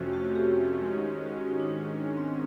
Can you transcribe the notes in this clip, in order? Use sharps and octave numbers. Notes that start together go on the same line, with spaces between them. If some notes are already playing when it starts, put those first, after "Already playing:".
Already playing: F2 C3 F3 A3 C#4 F#4
F#4
F#4
G4
G#2 D#3 G#3 C#4
F#4
F#4
D#4
D4
C4